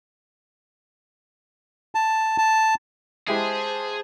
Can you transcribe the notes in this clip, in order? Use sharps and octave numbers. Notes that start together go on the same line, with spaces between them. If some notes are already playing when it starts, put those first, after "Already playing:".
A5
A5
G#3 E4 G4 G#4 C5 A5